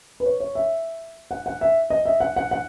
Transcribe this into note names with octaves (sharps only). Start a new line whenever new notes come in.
B4
C#5
C#5
E5
F#5
F#5
E5
D#5
E5
F#5
F#5
F#5